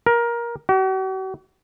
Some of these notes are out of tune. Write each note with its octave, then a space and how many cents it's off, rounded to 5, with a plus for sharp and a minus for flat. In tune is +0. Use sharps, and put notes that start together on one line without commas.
A#4 +15
F#4 +45